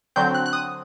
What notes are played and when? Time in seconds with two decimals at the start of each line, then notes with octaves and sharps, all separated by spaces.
0.16 D3 F#3 C4 G6
0.34 F#6
0.46 F#6
0.53 D#6